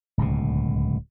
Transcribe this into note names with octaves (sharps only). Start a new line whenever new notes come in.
D1 C#2 B2